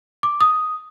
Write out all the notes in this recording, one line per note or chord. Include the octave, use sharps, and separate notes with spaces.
D6
D#6